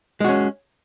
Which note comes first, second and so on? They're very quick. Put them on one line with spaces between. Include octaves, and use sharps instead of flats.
G#3 F#4 C#4